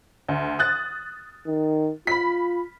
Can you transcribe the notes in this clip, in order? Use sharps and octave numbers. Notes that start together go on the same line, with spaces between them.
D2
D#6 F#6 A6
D#3
F4 B5 B6